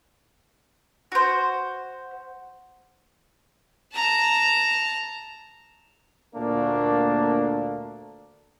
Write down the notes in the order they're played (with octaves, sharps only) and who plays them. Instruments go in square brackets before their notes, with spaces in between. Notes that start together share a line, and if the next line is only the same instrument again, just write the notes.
[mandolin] F#4 C5
[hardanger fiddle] A5 A#5
[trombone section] D2 A#2 A3 A#3 D4